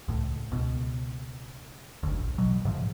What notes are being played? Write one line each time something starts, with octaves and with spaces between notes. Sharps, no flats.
C#2 A2
C#2 B2
F#1 D2
A#1
B2 F#3
G#2 C3 F3